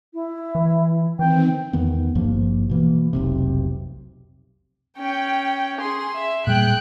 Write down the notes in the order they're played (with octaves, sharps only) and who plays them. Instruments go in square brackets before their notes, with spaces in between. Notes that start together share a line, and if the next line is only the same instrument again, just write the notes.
[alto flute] E4
[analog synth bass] E3
[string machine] D#3 C4 [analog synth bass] E3 [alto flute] G5
[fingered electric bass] E2 D#3 B3
G#1 G2 F3 A#3
B2 E3 A#3
F1 B1 C3
[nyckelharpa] C#4 [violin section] G5
[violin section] G#4 [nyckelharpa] C6
[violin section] E5
[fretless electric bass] A#2 G3 A#3 [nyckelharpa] G#4 G5 [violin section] F#6 D7